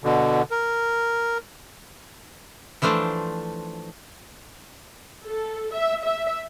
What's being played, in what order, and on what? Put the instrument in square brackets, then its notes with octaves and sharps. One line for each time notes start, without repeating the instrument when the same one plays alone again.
[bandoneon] B2 D3
A#4
[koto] E3 F3 A3 D4 C5
[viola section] A4
E5
E5